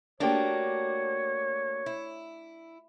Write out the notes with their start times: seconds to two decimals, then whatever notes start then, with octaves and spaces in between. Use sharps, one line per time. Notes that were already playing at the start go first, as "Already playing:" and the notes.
0.20 A3 A#3 D4 F#4 G4 C#5
1.86 E4